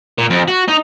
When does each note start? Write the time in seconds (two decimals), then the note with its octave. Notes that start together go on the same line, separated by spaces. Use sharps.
0.18 A#2
0.30 F2
0.48 F#4
0.68 D#4